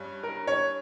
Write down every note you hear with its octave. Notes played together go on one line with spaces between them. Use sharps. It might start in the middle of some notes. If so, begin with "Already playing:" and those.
Already playing: G2 G3 C#4
A#4
C#5